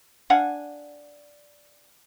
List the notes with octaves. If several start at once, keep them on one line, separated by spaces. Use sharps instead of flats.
D4 F5 F#5 G#5